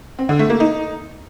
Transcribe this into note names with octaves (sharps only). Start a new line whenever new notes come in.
C4
D3
A3
A#3
D#4